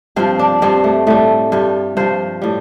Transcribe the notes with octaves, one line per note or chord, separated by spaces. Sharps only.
G2 F3 C4
D4
G2 G3 C4
A3
A2 G3 A3
G2 G3
G2 F3 C5
A2 G3